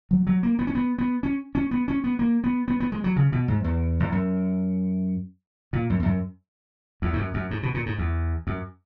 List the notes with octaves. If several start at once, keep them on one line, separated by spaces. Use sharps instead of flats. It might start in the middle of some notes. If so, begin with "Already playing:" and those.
F#3
F#3
A#3
B3
C#4
B3
B3
C#4
C#4
B3
C#4
B3
A#3
B3
B3
B3
G#3
F#3
C#3
B2
G#2
E2
E2
F#2
A#2
F#2
E2
F#2
E2
G#2
F#2
F#2
G#2
B2
A#2
G#2
E2
F#2